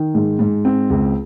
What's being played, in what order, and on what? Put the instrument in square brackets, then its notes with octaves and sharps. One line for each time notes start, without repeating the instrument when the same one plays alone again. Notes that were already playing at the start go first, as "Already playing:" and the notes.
Already playing: [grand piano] D#3
G#2
G#2
C4
C#2